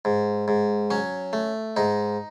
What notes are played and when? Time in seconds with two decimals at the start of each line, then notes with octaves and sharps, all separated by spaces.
0.05 G#2
0.48 G#2
0.90 F#3 C#4
1.33 A3
1.76 G#2 D#4